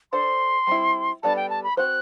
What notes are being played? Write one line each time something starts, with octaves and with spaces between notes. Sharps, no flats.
D4 A4 C5 C6
G3 C4 E4
G3 B3 D4 A4 A5
G5
A5
B5
C4 F#4 C5 F#6